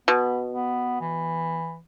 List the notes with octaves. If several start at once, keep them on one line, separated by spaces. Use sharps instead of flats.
B2 B3
B3
E3